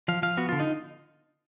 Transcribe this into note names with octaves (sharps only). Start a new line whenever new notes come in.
F3 F5
F3 F5
B3 F#4
D3 F4
D#4